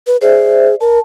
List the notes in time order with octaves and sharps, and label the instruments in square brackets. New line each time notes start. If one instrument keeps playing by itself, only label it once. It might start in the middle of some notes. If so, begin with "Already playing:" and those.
[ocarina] B4
[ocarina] G#4 [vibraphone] C5 D5 E5
[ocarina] A#4 [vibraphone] A5